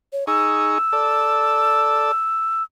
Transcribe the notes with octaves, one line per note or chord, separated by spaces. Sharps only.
C#5
D#4 G#4 C#6 E6
A4 D5